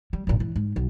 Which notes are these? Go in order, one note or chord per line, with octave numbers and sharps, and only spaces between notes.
G3
G#1 A#2
E3
G#2
B1